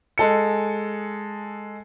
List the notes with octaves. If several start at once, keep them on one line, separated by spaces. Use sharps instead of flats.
G#3 A4 C#7